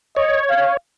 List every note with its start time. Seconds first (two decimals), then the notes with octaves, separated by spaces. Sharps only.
0.16 C#5 D#5
0.49 F5